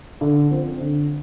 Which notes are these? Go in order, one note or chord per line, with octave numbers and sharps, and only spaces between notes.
D3
F3 C4
D3